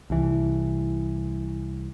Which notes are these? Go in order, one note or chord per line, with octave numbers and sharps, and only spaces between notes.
C2 E3